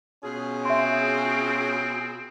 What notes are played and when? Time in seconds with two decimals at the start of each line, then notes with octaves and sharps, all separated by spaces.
0.24 B2 C#4 F4 G#4
0.65 C4 E5 C6